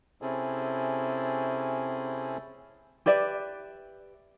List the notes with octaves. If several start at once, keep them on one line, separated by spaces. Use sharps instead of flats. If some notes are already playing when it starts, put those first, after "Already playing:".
C3 C4 C#4 E4 G#4 A4
G4 B4 D5 E5